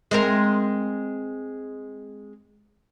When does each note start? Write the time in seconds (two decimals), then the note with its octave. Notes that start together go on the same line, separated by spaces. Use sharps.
0.11 G#3 C4 A#4